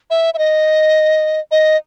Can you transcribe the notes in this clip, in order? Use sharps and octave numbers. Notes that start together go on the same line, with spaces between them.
E5
E5
D#5
D#5